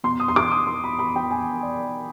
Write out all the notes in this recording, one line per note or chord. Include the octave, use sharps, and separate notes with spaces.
B2 C6
D#6
C6
D6
D#6
C6
B5
B5
G5
G#5
D5